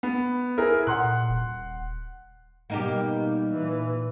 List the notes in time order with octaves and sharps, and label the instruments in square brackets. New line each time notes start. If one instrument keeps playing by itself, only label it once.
[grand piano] B3
E4 G#4 A#4
[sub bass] A#2 [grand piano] F#5 C6 F#6
[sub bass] D#1
[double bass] B2 G3 [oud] A#3 D#4 G4
[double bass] A#2 E3